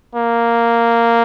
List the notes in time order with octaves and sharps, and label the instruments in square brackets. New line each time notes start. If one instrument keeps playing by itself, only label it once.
[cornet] A#3